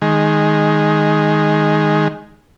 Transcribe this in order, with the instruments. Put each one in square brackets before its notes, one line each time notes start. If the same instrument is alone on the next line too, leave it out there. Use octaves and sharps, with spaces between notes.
[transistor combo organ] D#3 G#3